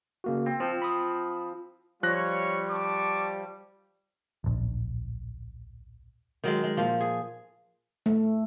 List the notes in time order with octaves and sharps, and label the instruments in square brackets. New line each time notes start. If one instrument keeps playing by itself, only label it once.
[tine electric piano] C#3 A#3 F#4
[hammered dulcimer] C4
[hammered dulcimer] F3 [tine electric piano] C4
[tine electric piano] B5 D#6
[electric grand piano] F3 F#6 A#6 [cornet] G3 [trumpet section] F4 C#5
[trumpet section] A5 C#6 D6
[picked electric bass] D1 A#1
[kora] D#3 F#3 G#3
G#3
A#2 F3
G#4
[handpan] A3